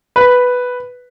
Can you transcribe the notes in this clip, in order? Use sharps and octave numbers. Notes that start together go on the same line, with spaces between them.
B4